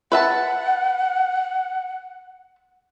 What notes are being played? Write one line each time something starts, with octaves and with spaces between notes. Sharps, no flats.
B4 E5 F#5 A5